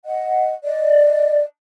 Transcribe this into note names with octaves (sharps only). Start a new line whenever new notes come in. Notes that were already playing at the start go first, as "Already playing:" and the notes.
D#5 F#5
D5 D#5